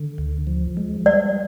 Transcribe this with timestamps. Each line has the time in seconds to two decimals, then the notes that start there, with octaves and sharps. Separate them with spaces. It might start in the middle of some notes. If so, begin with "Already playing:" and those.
Already playing: D3
0.18 D2
0.47 F3
0.77 G#3
1.06 G3 D5